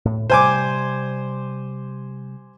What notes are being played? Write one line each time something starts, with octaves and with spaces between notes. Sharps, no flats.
A2
C3 G3 C5 G#5 D6